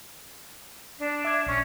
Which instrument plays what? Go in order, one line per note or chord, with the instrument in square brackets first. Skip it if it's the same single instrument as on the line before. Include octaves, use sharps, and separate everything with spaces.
[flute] D4
[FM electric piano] E5 D6 G#6
[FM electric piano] A#1 C#6 [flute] C#4